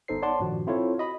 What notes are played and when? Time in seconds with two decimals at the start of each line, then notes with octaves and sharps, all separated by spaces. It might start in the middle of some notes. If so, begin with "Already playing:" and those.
0.08 G1 B3 D#4 A4 C5 C7
0.22 C#5 D5 F#5 A5 C6
0.40 G2 A#2 D#3 F3 F#4
0.67 C4 E4 F4 A4 C5 C#5
0.98 F#4 D#5 B5